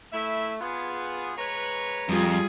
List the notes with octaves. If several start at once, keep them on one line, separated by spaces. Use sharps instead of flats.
A3 E4 E5
B3 F4 G#4
G#3 B4 C#5 A#5
F2 G3 F4 G#4